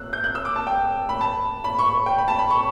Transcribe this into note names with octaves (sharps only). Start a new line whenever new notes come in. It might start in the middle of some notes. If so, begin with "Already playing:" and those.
Already playing: E6 F#6
G6
F#6
E6
D6
A5
G5
B5
A5
B5
C#6
G5
B5
A5
B5
C#6